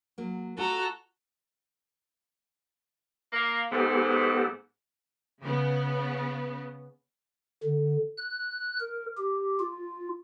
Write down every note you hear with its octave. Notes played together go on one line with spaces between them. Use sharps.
F#3 A#3
A3 F4 F#4 A4 A#5
A#3
G#2 B3 G4 A4
C#3 B3
D3
F#6
A#4
G4
F4